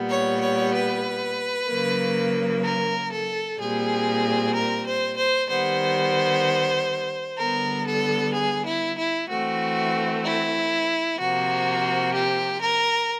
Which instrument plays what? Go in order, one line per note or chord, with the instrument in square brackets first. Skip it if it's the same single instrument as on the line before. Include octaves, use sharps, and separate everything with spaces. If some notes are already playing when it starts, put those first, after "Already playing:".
Already playing: [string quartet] A#2 G3 B3
C#5
C#5
B4
C#3 F#3 A#3
A#4
A4
A#2 G3 C4 G#4
A#4
C5
C5
D#3 G3 B3 C5
D3 G3 B3 A#4
A4
G#4
E4
E4
E3 A3 C4 F#4
E4
C3 F3 A#3 F#4
G4
A#4